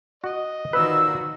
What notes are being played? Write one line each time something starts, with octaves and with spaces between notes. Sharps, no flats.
F#4 D#5
A#2 D#3 F#4 B4 C5 E6